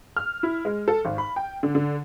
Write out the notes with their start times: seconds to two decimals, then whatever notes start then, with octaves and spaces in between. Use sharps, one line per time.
0.17 F6
0.43 E4
0.65 G#3
0.88 A4
1.05 G#1
1.18 B5
1.36 G5
1.63 D3
1.75 D3